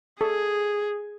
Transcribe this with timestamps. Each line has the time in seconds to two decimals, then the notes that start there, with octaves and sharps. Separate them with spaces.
0.21 G#4 A4